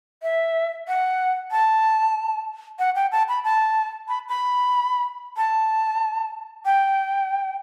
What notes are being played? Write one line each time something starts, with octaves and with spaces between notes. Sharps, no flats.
E5
F#5
A5
F#5
G5
A5
B5
A5
B5
B5
A5
G5